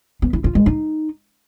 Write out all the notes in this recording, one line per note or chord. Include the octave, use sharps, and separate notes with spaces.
B3
E4
F4
G#3
D#4